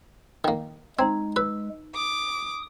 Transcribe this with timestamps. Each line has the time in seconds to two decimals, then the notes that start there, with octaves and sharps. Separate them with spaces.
0.44 D#3 A#3
0.99 G#3 C4 D#4 A#5 G#6
1.36 B4 E6
1.95 D6 D#6